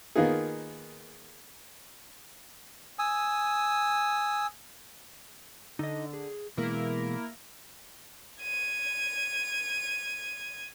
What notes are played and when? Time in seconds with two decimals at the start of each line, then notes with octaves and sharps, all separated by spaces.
0.16 D#3 A#3 B3 D#4 F4 G#4
2.99 G#5 D#6 E6
5.79 D3 D#4 D#5
6.13 G#4
6.57 B2 E3 G#3 A#3 E4 A#4
8.42 G#6 D#7